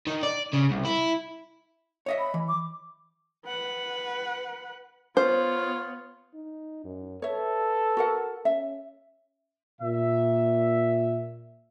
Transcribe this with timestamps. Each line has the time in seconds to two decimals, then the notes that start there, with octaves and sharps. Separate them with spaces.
0.07 D#3
0.23 D5
0.53 C#3
0.71 C2
0.85 E4
2.06 C#5 D#5 E5
2.19 B5
2.34 E3
2.48 D6
3.46 B4 F#5
5.17 B3 F4 C5 C#5
6.34 D#4
6.85 F#2
7.22 A4 B4 C#5 E5
7.97 F#4 A#4 F#5
8.45 C#4 E5
9.82 A#2 E5